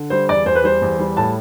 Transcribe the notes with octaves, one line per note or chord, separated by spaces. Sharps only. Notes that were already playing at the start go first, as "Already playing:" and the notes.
Already playing: D3
G3 C5
E2 D5
E2 C5
B4
G3 C5
E2
G3
A2 A5